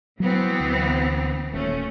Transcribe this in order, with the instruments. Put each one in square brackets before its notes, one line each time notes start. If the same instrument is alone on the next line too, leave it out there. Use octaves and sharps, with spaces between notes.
[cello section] E3 B3 C4 [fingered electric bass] F#3
[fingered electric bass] D2
[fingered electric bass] D#1 [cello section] A3 C#4